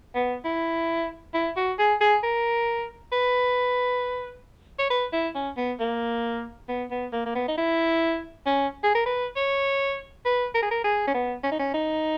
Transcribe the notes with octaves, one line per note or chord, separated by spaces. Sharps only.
B3
E4
E4
F#4
G#4
G#4
A#4
B4
C#5
B4
E4
C#4
B3
A#3
B3
B3
A#3
A#3
B3
D#4
E4
C#4
G#4
A#4
B4
C#5
B4
A#4
G#4
A#4
G#4
C#4
B3
C#4
D#4
C#4
D#4